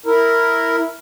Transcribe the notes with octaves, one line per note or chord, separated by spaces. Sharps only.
E4 A#4